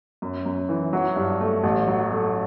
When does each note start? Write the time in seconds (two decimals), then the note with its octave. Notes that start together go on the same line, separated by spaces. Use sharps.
0.22 F#2
0.46 F#2
0.69 E3
0.93 F#3
1.16 G2
1.41 A3
1.63 A1
1.87 F#3
2.11 A3